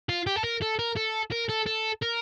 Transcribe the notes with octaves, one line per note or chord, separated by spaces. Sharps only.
F4
G4
A4
A#4
A4
A#4
A4
A#4
A4
A4
A#4